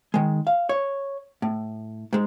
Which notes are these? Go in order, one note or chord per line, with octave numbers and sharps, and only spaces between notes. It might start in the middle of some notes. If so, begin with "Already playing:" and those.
D#3 G#3
F5
C#5
A2
G#2 G#3